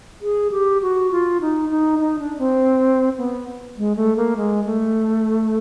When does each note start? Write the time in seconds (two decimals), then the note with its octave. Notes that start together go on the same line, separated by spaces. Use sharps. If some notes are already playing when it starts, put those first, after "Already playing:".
0.22 G#4
0.52 G4
0.82 F#4
1.11 F4
1.41 D#4
1.70 D#4
1.99 D#4
2.19 D4
2.39 C4
3.18 B3
3.78 G#3
3.96 A3
4.17 A#3
4.37 G#3
4.65 A3